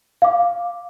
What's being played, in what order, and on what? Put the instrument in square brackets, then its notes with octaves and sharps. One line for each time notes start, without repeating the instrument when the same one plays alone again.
[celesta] F5 D6